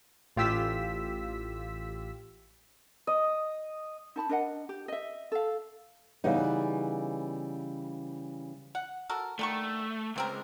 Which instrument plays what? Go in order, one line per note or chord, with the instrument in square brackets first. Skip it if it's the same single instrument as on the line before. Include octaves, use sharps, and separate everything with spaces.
[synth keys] A1 F4 G4 E6 B6
[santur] D#5
[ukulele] D#4 A5 B5
D4 A#4 D#5 F#5
G4
D#5 E5
A4 F5
[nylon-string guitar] C#3 E3 G3 B3 D#4
[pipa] F#5
F#4 A4 A#4
[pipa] D3 D#3 C#6 [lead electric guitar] A3
[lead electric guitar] C#2 [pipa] A#3 C4 A#4